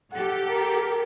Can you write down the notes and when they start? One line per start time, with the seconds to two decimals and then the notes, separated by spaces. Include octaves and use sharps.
0.13 G4 A4 F#5
0.49 A#4